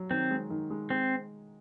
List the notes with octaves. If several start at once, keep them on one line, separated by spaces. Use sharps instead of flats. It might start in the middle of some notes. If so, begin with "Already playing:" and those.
Already playing: F#3
D#3 C4
G#3
D#3
G#3
G#3 C4